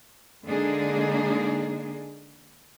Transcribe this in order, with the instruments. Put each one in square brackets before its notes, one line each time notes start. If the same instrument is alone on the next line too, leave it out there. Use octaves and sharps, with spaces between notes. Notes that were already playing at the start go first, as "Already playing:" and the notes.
[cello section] D3 G#3 A#3 D4 D#4 G#4